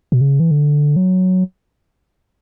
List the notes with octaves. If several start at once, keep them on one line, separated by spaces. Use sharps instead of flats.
B2
C#3
E3
D3
F#3